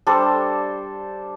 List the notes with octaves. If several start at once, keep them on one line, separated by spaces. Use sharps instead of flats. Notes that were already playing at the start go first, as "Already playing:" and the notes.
G3 D4 A4 C5